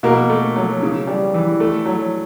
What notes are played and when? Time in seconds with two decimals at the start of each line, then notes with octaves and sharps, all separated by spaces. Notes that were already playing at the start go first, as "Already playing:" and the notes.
0.03 B2 A#3
0.29 A3
0.56 F#3
0.82 C#3
1.07 G3
1.34 E3
1.60 A3
1.85 F#3